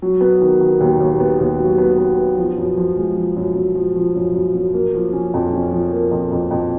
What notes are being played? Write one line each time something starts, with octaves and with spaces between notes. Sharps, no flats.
F#3
B3
D#3
D#3
D#2
D#2
B3
D#2
F#3
B3
B3
B3
F3
F#2
F3
G#3
F3
F#2
F#2
F3
F3
F#2
F#2
F#2
A#3
F3
C#4
F2
C#4
F3
A#3
F2
F2
F2